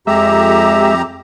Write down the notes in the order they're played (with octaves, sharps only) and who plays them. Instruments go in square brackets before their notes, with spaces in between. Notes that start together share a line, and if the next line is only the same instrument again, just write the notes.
[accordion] F2 G4 A#5 [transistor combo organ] G#3 E5